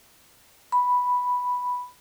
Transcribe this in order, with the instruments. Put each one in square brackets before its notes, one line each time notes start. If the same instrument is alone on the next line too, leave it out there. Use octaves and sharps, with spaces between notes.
[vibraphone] B5